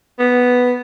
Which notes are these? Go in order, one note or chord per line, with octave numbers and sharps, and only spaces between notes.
B3